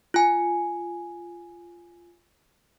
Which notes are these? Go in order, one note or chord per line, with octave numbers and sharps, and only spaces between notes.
F4 G#5